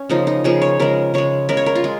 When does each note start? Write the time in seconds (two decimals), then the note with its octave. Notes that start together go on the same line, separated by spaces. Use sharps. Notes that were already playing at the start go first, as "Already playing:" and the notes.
Already playing: C#4
0.09 C#3 F3 A#3 D#4
0.27 D#4
0.44 C#3 F3 A#3 G#4
0.62 C#5
0.80 C#3 G#3 A#4
1.14 C#3 G#3 C#5
1.49 C#3 G#3 A#4
1.57 C#5
1.66 A#4
1.75 F4
1.84 G#3